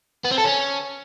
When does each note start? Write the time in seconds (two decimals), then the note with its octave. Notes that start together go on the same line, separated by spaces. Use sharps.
0.24 B3
0.31 C4
0.38 A4
0.44 C#4